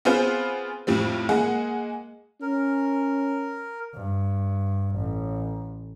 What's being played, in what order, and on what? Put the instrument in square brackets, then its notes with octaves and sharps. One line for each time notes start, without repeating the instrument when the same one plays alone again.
[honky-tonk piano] B3 C4 F4 G#4 B4 C5
F2 A2 G3 C4
G#3 A#3 G#4 F#5
[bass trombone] C#4 [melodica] A#4
[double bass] G2
A1